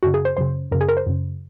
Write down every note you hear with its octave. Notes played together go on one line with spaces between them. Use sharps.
F#2 C#3 F#4
G#4
C5
F#2 C#3 C5
F#2 C#3 A#4
G#4
A#4
C5
F#2 C#3